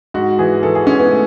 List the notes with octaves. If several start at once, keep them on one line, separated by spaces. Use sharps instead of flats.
G#2 F#4
E3 G#4
E3 A4
G#4
G#2 C#4
B3
A3